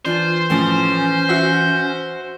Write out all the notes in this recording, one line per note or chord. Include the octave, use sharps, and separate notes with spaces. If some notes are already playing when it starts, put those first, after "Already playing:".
E3 D4 F4 C5
A2 F3 C#4
F#4 E5